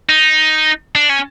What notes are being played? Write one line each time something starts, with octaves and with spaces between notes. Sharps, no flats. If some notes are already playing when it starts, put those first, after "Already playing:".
D#4
D4
C#4